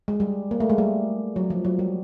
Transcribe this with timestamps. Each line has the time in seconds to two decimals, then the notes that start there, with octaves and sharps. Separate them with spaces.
0.08 G#3
0.20 G3
0.51 A#3
0.60 A3
0.70 G#3
0.78 G3
1.36 F#3
1.50 F3
1.65 F#3
1.79 G3